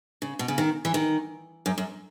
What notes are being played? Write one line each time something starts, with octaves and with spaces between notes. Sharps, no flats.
C#3
B2
C#3
D#3
E3
D#3
F#2
F#2